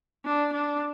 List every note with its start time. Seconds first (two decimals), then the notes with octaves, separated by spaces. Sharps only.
0.25 D4
0.53 D4